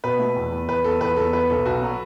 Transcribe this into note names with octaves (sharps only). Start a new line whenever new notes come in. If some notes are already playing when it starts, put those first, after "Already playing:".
B2 B4
A3
E2
E2
E2 B4
E2 A4
E2 B4
E2 A4
B3 B4
B1 A4
B1 F#4
F#3